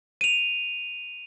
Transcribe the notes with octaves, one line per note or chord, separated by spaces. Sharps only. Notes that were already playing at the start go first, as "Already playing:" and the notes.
D#7 F7